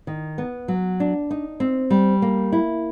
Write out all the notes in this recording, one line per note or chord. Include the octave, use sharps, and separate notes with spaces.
D#3
B3
F#3
D4
D#4
C4
G3
A#3
E4